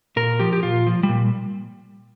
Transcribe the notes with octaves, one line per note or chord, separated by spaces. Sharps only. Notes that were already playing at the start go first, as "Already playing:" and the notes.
A#2 A#4
F3 G4
G4
A#2 F4
F3
G3
A#2